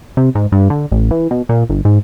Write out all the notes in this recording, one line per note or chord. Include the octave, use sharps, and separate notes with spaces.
C3
G#2
G2
D3
A1
E3
B2
A#2
G1
G#2